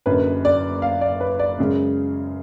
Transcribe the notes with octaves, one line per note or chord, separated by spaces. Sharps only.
F#1 F#2 D3 B4
D5
F5
D5
B4
D5
F#2 C#3 G#3